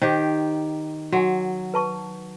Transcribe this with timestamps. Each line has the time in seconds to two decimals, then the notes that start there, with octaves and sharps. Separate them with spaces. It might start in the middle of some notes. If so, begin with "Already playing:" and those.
0.02 D#3 G4 C5
1.12 F#3 F#4 F#5 G#5
1.74 B4 A5 C#6